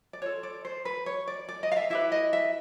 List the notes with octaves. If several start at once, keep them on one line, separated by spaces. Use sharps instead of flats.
D5
F4 A4 C#5
D5
C5
B4
C#5
D5
D5
D#5
F5
E5
E4 G4 B4 E5
D#5
E5